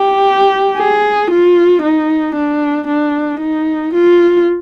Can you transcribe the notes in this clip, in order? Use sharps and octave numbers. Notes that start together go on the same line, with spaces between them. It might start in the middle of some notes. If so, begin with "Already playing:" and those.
Already playing: G4
G#4
F4
D#4
D4
D4
D#4
F4